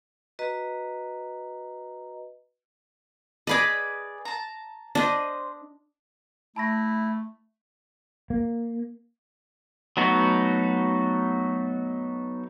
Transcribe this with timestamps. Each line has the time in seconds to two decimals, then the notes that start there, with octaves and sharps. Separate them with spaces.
0.39 F#4 B4 D#5 A#5
3.47 G#4 B4 D5 D#5 B5 D6
4.25 A5 A#5
4.95 D4 C5 D#5
6.56 A3 E4 A5 B5 A#6
8.30 A#3
9.97 F#3 A3 B3 D#4 F#4